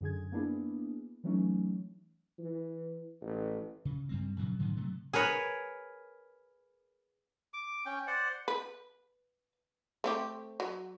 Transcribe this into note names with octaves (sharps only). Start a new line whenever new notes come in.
F#2 D3 G#4 G#6
A#3 B3 D4 E4 G#4
E3 F#3 A3 C#4 D#4
E3
A1
C#3
G2 G3 C4
A#2 C#3 F3 F#3
G#2 D3 F3 F#3
C3 F#3 A3
G#4 A#4 B4 C#5
D6
C#4 G5
C5 D5 F#5
B4
A3 C4 G4
F#3